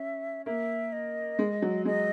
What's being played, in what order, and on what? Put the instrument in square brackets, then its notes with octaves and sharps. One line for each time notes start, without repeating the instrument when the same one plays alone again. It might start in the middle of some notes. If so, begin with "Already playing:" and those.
Already playing: [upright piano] C#4 [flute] E5
[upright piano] A#3 [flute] E5
[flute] D#5
[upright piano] G#3
F#3
[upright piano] G#3 [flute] D#5